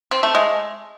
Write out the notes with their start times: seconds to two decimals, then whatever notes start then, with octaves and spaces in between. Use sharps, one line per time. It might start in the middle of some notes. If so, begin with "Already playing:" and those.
0.11 C4
0.23 A3
0.35 G#3